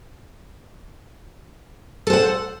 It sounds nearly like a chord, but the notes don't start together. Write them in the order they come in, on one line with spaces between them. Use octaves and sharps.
A4 C5 F#5